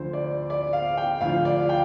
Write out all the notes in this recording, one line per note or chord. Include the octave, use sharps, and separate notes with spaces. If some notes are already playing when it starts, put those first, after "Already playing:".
Already playing: D2 D3 F3 C5
D5
D5
F5
G5
D2 D3 F3 F5
D5
F5
G5